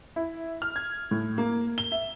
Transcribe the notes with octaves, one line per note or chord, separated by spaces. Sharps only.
E4
F6
G#6
A2
A#3
G7
E5